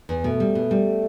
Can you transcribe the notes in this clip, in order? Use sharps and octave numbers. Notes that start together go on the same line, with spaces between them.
E2
B2 A3
G3
B2
G3